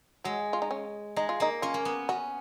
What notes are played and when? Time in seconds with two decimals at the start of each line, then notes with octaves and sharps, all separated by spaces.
0.24 F#3 G#3
0.53 F4
0.62 D#4
0.71 C#4
1.16 G#3 D#4
1.29 F4
1.40 A#3 D#4
1.62 C#4 F4
1.74 A#3
1.85 B3
2.09 C#4 F#4